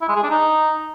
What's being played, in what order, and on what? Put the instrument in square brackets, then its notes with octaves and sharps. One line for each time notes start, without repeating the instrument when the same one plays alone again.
[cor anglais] E4
G#3
G#4
D4
D#4